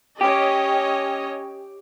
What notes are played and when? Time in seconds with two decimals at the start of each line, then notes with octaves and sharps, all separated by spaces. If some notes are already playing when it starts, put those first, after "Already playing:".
0.21 C#4 G4 C#5 D#5